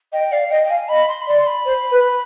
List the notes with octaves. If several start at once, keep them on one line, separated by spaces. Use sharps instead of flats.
D#5 G5
D5 F5
D#5 G5
G5
F5 G#5
D#5 B5
C6
B5
D5 C6
C6
B5
C5
B4